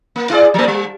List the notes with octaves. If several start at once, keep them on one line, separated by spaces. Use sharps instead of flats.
A#3
E4 G#4 D5
F3 G3 A3
G3